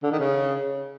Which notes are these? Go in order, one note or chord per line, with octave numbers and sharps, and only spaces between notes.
D3
D#3
C#3